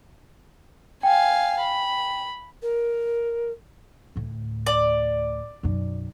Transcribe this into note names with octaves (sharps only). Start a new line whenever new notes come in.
F5 G5 G#5
B5
A#4
D2 A2
D5
B1 F#2